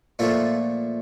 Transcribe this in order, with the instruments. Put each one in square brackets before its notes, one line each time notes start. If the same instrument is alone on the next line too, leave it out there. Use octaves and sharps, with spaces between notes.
[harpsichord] A#2 F3 A3 F4 A4